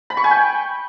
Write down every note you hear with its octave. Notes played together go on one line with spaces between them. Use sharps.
B5
C#6
G#5
G5